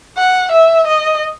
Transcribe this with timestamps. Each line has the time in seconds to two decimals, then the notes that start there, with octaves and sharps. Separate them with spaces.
0.17 F#5
0.52 E5
0.87 D#5